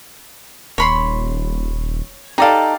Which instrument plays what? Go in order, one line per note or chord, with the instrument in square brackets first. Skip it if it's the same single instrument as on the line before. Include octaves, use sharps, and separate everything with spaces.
[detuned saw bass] D#1 [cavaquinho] C#5 B5 C6
[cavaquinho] D#4 A4 [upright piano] G4 D5 F5